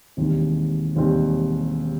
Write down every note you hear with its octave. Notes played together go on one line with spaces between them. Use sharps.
E1 D#2 D#3 G3 C4
E1 D#2 D#3 G3 C4